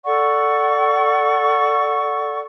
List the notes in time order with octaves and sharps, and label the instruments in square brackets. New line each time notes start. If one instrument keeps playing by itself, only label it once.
[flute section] A4 D5 F#5 C#6